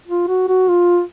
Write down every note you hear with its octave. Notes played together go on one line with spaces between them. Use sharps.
F4
F#4
F#4
F4